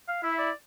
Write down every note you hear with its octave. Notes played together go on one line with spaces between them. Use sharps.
F5
E4 E5
D5